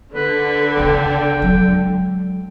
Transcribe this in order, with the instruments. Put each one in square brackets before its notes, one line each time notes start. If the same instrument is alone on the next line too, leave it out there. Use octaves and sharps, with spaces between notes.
[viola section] D3 [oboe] B4
[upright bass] C#2 B3 [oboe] G5
[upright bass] F#3 G#3